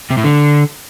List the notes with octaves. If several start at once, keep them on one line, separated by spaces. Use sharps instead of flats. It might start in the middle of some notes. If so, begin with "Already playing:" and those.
C3
A2
D3